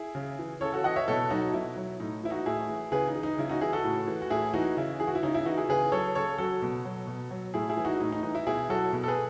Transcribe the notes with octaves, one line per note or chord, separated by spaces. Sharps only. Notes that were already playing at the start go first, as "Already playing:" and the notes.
Already playing: E4 G#4
C#3
E3
C#3 A4 C#5
F#4 A4
E3 D#5 F#5
C#5 E5
B2 A4 C#5
F#3 D#4 F#4
B2 E4
F#3
A2 D#4
E3 E4
D#4 F#4
A2 E4 G#4
E3
C#3 G#4 B4
D#4
E3
D#4
C#3 E4
D#4 F#4
E3 E4 G#4
F#4 A4
A2
E3
F#4
A2 E4 G#4
E3 D#4 F#4
C#3 E4
E3 G#4
F#4
E4
C#3 D#4
E4
E3 D#4 F#4
E4 G#4
C#3 G#4 B4
F#3 A4 C#5
C#3 A4 C#5
F#3 F#4 A4
B2
F#3
B2
F#3
A2 E4 G#4
E4 G#4
E3
D#4 F#4
A2 D#4
D#4
E3 D#4
E4
B2 E4 G#4
F#3 F#4 A4
B2
A4
G#4 B4